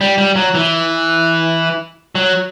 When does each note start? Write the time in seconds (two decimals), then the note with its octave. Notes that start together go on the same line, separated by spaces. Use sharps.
0.01 G3
0.18 G3
0.36 F#3
0.55 E3
2.15 F#3